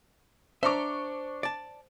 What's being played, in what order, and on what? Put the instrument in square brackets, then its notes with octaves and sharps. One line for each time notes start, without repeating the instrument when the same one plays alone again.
[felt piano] D4 C#6 D6 [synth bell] C5 [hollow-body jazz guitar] E5 A#5
[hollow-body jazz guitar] D5 A5